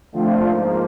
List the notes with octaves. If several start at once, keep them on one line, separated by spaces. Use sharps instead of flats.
D3 F3 A3 C4 F4
G#2 F3 A#3